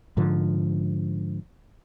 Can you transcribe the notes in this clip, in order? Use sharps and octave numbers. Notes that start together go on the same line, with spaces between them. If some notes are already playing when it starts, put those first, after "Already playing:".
G#2 D3 F3